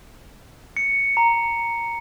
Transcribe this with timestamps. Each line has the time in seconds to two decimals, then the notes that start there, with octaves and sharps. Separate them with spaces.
0.77 C#7
1.17 A#5